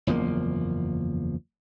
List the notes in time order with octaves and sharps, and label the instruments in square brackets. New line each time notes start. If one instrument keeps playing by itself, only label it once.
[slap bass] F#1 E2 F3 A#3